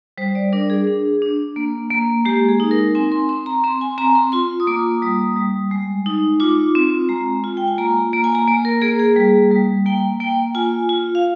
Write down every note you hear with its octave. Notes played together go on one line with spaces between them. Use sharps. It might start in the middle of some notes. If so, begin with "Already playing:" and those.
G3 C5
D5
D4 A#4
G#4
D4
D4
A#3
A#3
G#3 G4
G#4
D#4
A#4
C4 G#5
C6
C4 C6
A#5
C4 C6
G#5
C4 A#5
C6
F4 C6
D#6
A#3 D6
G3 D#6
G3
G#3
D#4
F4 D6
C4
G#3 A#5
F4
G5
G#5
A#3 A#5
A#3 A#5
G#5
A#5
A#3
A#4
A#3 G#4
G#4
G3 G#4
G3
A#3 G5
A#3 G5
F4 G#5
F4
F5